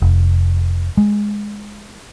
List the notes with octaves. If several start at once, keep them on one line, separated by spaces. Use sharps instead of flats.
F1
G#3